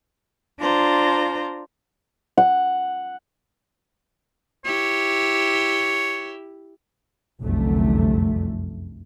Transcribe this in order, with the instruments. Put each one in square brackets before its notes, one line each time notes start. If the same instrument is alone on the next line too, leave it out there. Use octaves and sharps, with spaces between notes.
[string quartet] D4 F4 C5 A#5
[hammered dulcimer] F#5
[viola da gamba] E4 G4 [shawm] C#5
[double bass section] F1 C2 F#2 D3 A3